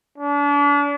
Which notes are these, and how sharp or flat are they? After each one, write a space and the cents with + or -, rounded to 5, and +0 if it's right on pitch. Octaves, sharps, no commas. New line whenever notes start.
D4 -35